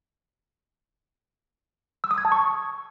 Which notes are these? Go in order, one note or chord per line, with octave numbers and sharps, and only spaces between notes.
E6
D#6
G#6
A5
C#6